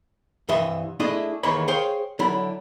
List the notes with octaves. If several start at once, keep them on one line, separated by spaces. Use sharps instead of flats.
C2 G2 E3 D#5 E5
A3 D4 E4 G#4 D#5
D#2 D#3 E3 G#3 C#5 B5
G#4 C5 C#5 F5 G5
D3 F#3 E4 B5